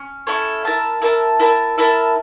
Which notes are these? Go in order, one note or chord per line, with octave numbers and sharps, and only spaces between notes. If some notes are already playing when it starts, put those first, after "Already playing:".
Already playing: C#4
C#4 E4 A4 C#5
E4 A#4 E5 A5
E4 A#4 E5 A5
E4 A#4 E5 A5
E4 A#4 E5 A5